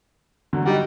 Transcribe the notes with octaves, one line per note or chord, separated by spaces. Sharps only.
E2 D3 F#3
G3 D#4 F#4